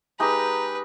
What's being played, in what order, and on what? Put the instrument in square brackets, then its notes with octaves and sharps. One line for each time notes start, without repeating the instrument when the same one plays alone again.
[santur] G#3 D#4 G4 [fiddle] B4 [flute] A#5